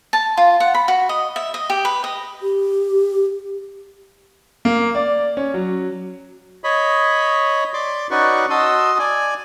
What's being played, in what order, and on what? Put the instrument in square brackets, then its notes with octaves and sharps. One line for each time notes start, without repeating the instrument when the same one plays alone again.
[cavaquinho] A5
F4
F#5
B5
F#4
D#5
E5
D#5
G4
B4
D#5
[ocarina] G4
[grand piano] A#3
D5
C#4
F#3
[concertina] C#5 D#5 B5
D5 C6 D6
C#4 D#4 F#4 B4 D5 C#6
F#4 D#5 A5 C6 D#6 E6
D5 G#5